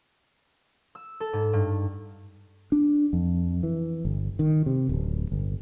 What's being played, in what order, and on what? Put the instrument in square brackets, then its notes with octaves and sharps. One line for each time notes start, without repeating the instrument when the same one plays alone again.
[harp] E6
A4
G#2
G2
[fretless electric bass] D4
F2
E3
G1
D#3
C3
D1
G1